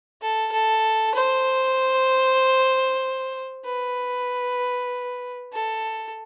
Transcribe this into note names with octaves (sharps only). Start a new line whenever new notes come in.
A4
A4
C5
B4
A4